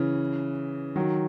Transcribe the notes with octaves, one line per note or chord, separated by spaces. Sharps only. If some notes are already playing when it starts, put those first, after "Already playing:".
Already playing: C#3 E3
D#3 F#3